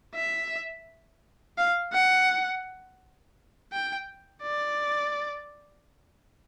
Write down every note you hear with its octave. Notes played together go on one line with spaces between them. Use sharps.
E5
F5
F#5
G5
D5